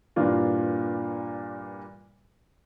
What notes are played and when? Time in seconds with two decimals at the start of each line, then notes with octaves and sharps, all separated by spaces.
0.16 G2 A#2 E3 A#3 D4 F4